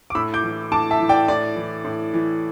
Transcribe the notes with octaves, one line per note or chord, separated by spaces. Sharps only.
D6
A2 B5 E6
D6 G6
E3
A2 A5 D6
E5 A5
E3
D5 G5
A2 D5
E3
A2
E3